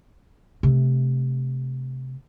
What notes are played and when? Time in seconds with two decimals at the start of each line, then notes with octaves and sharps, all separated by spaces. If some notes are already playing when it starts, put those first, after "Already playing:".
0.63 C3 A3